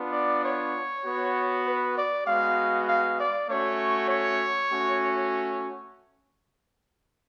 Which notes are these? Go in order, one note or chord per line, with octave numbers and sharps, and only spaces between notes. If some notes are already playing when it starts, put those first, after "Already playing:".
Already playing: B3 D4 F4
D5
C#5
B3 F#4
B4
D5
G#3 B3 F#4 F5
F5
D5
A3 C#4 F#4 C#5
C#5
A3 C#4 F#4